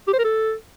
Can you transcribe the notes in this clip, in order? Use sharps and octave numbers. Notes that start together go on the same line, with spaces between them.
G4
C5
A#4
A4